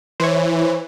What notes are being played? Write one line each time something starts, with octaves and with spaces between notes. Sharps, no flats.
E3 C5 C#5